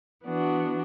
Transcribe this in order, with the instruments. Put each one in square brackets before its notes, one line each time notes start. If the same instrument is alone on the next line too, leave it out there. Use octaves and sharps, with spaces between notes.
[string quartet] E3 B3 D4 F#4